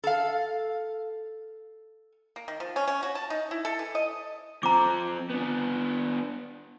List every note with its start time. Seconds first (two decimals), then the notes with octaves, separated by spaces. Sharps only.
0.04 A4 F5
2.36 A#3
2.48 D#3
2.60 F3
2.76 C#4
2.88 C#4
3.03 F#4
3.15 A5
3.30 D#4
3.51 E4
3.65 A4
3.79 E3
3.95 D#5
4.63 F3 C4 A#5 D6
5.30 B3 D4